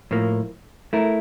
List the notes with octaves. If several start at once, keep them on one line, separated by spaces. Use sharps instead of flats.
A2 F3 A#3
A3 E4 A#4